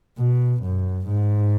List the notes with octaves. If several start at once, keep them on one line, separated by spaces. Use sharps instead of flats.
B2
F#2
G#2